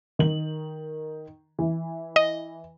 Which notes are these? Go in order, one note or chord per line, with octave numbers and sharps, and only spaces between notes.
D#3 F#7
E3
D#5